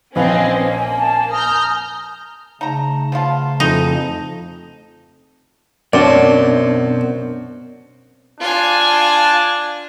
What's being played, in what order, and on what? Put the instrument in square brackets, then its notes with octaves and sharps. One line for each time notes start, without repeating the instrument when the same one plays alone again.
[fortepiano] A#1 B4 F5 [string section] C4 C#4 [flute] D#5 [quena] G#5
[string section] A#3
[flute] A5
[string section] A#5 F6 G6 [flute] D#6
[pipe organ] C#3 A3 A5 [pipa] D#4 A#5
[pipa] F3 B3 F4
[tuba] F2 [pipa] E3 [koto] D#4
[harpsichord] F#2 [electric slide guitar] B2 C5 A5 [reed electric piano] C4 D4 D5
[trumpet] D4 [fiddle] F4 G#5